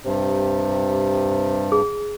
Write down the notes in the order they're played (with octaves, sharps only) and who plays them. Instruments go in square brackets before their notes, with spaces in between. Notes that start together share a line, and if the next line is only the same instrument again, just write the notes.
[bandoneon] G2 [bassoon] C3
[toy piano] G#4